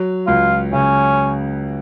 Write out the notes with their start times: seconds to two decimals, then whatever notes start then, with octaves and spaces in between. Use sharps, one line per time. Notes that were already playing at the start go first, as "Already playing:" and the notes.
Already playing: F#3
0.27 C#2 F4
0.73 C#3 C#4